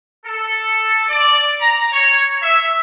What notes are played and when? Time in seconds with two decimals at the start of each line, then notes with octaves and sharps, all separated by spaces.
0.25 A4
1.08 D5
1.59 A#5
1.92 C#5
2.42 E5